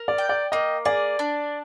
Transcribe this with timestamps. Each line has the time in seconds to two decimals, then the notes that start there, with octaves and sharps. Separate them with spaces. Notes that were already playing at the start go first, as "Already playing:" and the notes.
Already playing: A#4
0.08 D5
0.18 G5
0.29 D5
0.52 A#3 D#5
0.85 G#4 D5
1.19 D4